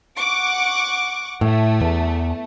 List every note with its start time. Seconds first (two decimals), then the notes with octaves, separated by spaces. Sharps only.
0.18 F#5 C#6 D6
1.41 A2 A3
1.81 E2